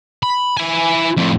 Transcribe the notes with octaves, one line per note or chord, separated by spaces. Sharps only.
B5
E4 G#5
F2 A2